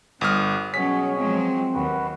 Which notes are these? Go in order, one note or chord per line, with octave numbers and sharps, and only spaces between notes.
G1 G3 D#6 F6 F#6
B2 F#3 C#4 G#4 C#5 F#5 B6
F3 F#3 G#3 C4
D#2 F#4 B4